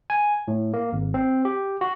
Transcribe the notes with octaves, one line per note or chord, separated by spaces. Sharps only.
G#5
A2
A#3
G#1
C4
G4
F#4